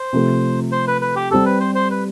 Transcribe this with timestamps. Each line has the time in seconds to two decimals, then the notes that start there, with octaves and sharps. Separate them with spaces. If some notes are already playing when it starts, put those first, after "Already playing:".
Already playing: C5
0.13 C3 F3 A3
0.72 C5
0.87 B4
1.01 B4
1.16 G4
1.31 G3 C4 G4 A4
1.46 B4
1.60 C5
1.75 C5
1.91 B4